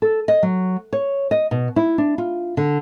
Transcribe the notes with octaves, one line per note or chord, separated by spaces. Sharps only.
A4
D#5
F#3
C#5
D#5
B2
E4
D4
F4
D3